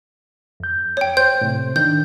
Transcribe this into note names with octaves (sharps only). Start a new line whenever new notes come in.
F2 G6
C#5 G5
C5 G6
A2 C3
D#3 D4 G6